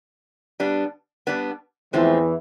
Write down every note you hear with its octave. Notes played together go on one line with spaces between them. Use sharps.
G3 B3 D4
G3 B3 D4
E2 A2 E3 F3 G#3 C4